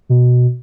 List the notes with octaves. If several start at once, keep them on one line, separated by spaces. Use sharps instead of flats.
B2